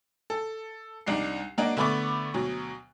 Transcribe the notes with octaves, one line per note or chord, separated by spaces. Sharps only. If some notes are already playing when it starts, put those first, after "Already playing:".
A4
C2 D4 D#4 C7
F#3 A#3 D4 F#4 D#5
D3 A3 B3 B5 C#6 D6
D2 B2 F#3